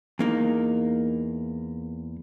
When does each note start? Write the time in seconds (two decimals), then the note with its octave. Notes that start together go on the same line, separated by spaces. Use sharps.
0.19 E2 A#3 D#4